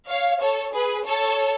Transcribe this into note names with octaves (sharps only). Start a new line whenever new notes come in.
C#5 F5
A4 C#5
G#4 B4
A4 C#5